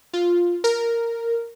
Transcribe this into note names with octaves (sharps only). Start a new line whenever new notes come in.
F4
A#4